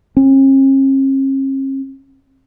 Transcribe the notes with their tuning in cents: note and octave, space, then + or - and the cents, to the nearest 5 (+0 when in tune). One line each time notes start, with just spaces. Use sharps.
C#4 -45